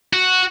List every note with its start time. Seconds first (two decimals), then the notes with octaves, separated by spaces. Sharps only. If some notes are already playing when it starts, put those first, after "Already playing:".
0.13 F#4